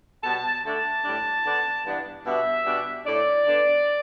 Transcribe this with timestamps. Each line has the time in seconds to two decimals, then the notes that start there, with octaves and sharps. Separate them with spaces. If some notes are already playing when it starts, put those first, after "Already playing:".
0.23 B2 G3 B3 A5
0.64 D3 A3 D4 A5
1.05 A2 G3 D4
1.45 D3 B3 D4
1.85 G2 E3 B3 D4
2.25 B2 G3 B3 D4 E5
2.66 B2 G3 D4
3.06 A2 A3 D4 D5
3.46 D3 B3 D4